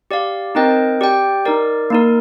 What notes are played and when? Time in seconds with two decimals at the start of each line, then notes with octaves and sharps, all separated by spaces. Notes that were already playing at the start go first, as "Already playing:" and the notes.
0.11 G4 D5 F5
0.55 C4 D#4 A#4 D#5 G5
1.01 G4 D5 G5
1.45 D#4 A#4 D5
1.90 A#3 D#4 A#4